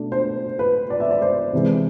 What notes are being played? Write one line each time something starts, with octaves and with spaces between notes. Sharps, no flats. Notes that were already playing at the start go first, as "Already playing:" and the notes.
Already playing: B2 A3 D4
C5
B4
D5
E5
D5
C5
C3 E3 G#3